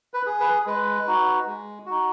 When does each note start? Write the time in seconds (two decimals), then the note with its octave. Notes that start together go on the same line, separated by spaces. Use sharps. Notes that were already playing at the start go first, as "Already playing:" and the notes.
0.14 B4
0.26 G#4
0.40 B4
0.66 G#3 B4
1.07 D#4 F#4
1.46 G#3
1.86 D#4 F#4